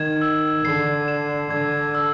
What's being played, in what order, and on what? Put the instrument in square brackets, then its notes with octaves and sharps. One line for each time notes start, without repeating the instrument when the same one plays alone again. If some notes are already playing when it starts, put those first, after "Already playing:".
Already playing: [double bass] D#3 [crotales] G#6 E7
[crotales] E6
[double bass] D3 [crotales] C7
[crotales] E7
[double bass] D3 [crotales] G#6
[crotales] E6